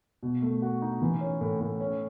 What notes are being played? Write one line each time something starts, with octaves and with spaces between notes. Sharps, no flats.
B2
A3
F#4
D#4
E3
C#4
A2
A2
C#4